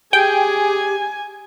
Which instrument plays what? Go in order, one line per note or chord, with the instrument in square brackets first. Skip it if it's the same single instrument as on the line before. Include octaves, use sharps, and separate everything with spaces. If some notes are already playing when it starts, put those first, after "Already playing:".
[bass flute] G4 [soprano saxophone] G#4 [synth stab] G5 [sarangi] G#5